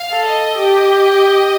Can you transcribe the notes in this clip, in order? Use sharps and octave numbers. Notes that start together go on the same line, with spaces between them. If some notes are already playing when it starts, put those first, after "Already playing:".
Already playing: F5
A4
D#5
G4